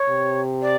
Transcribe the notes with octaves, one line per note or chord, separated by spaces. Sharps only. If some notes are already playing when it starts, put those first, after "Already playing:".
Already playing: C#5
C3
D5